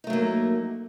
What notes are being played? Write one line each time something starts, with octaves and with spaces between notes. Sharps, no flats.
F#3 A3 A#3 D#4